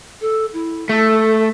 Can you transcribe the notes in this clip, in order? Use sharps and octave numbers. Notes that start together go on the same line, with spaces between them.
A4
E4
A3 A4